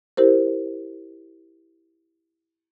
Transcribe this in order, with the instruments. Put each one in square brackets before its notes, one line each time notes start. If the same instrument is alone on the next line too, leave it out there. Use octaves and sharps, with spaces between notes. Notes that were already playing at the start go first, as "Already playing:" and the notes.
[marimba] E4 G4 A#4 C5